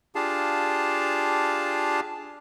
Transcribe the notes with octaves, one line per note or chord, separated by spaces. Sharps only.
D4 F4 G4 G#4 F5 A5